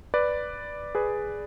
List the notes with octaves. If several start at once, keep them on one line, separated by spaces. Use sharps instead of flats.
B4 D5
G#4 B4